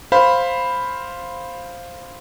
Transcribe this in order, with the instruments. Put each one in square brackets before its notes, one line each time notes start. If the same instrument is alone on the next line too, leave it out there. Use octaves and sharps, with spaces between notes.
[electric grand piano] C5 F5 B5